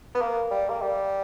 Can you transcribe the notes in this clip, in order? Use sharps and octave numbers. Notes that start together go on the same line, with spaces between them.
B3
A#3
G3
A#3
G3